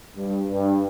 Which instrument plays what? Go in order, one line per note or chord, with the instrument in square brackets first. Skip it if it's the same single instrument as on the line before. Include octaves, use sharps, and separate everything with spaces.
[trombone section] G2
G2